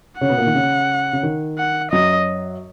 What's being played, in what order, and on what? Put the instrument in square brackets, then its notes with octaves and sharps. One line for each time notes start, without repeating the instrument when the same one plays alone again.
[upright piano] C#3 C#4 [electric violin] F#5
[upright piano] B2 B3
A#2 A#3
D#3
C#3
C#3
D#3
[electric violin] F#5
[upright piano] F#2 F#3 [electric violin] D#5